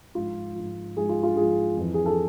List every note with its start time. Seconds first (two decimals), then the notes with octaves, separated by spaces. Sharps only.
0.15 G#2 F3 F4
0.55 G#2 F3
0.96 G#2 F3 G#4
1.09 F4
1.23 F4
1.36 G#2 F3 G#4
1.77 F2 E3
1.94 G#4
2.06 A4